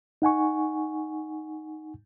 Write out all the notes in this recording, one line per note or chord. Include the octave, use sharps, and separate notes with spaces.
D#4 F#5 G#5 C#6